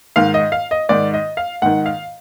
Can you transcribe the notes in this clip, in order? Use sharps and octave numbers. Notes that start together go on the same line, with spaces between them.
G#2 D#3 F5
D#5
F5
D#5
G#2 D#3 D5
D#5
F5
G#2 D#3 F#5
F5